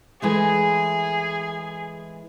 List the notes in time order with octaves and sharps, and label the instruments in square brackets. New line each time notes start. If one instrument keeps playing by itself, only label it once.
[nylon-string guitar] E3 G#3 A3 [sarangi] G#4